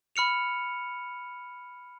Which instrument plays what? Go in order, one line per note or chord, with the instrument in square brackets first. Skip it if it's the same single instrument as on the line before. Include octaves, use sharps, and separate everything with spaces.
[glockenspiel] B5 F6 C#7 F7